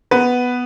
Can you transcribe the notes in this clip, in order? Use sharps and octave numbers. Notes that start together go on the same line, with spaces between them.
B3 B4